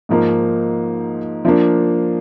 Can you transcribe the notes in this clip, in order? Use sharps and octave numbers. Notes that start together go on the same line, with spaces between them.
G#2 F3 A#3 D#4
F3 A#3 D4